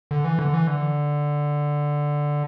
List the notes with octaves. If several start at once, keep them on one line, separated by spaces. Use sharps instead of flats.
D3
E3
D3
E3
D3